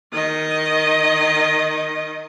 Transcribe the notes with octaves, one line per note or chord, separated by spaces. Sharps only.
D#3 D#5